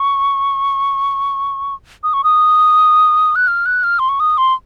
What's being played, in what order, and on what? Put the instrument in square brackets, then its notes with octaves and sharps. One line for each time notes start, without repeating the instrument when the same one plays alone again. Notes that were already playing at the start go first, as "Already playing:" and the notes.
Already playing: [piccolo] C#6
D#6
C#6
D#6
F#6
F6
F#6
F6
C6
C#6
D#6
C6